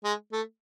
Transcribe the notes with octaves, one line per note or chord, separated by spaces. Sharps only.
G#3
A3